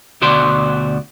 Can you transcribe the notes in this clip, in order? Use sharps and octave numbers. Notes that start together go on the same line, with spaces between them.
D2 B2 F#4 C5 D5 C6